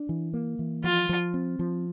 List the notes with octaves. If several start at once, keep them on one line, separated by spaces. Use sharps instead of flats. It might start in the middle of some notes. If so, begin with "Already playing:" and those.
Already playing: D4
E3
A#3
E3
F3 F4
F3
C4
F3